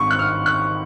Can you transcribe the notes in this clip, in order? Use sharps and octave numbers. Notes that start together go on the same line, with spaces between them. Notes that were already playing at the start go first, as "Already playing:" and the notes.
Already playing: G#1 G#2 D#3 G#3 C4 C#6
F#6
F6
F#6